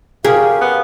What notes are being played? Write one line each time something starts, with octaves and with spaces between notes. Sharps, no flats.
C#4 G4 G#4 A#4 F5
B3